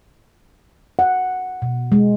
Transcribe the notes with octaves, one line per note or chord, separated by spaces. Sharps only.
F#5
B2
G#3